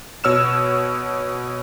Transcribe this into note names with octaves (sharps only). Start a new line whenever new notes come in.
B2 C#5 E6 F6 E7